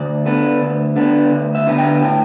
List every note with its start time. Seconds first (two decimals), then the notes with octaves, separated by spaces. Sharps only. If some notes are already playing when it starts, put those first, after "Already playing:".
Already playing: D2 D5
0.25 D3 B3 D4
0.61 D2
0.96 D3 B3 D4
1.31 D2
1.55 E5
1.67 D3 B3 D4
1.78 G5
2.02 A2 G5